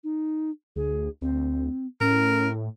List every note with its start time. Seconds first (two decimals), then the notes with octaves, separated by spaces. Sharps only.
0.04 D#4
0.76 D2 G#4
1.22 D2 C4
2.01 A2 C#4 A#4